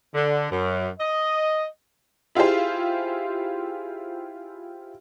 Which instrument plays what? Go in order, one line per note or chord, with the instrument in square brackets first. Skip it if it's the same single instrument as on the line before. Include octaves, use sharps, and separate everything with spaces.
[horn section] D3
F#2
D#5
[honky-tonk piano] E4 F4 G4 G#4 C5